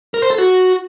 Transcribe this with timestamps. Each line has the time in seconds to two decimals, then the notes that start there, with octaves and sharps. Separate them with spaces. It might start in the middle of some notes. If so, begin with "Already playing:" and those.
0.14 A#4
0.22 C5
0.30 A4
0.38 F#4